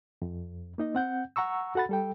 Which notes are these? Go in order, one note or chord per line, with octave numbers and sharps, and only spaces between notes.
F2
A#3 D#4 D#5
C4 F#5 G6
F#5 A#5 C#6 E6
F#4 A4 F#5 B5 A6
G3 A4 G5